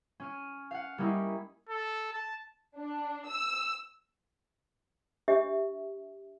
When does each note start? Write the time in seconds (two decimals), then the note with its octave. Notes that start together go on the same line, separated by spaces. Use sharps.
0.20 C#4 F6 D#7
0.71 F5 F#5
0.98 G3 A#3 C#4 D#4 E4
1.69 A4
2.13 A5
2.78 D4
3.27 E6
5.28 D4 G4 E5